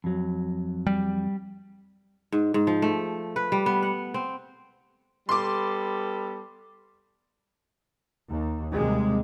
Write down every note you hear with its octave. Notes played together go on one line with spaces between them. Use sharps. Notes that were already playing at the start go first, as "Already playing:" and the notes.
F2 F#3
G3
G#2
G#2
F3
A3
B4
G3
B3
F#5
C4
G3 B3 A4 C6 D6
D#2
D#2 C3 G3 G#3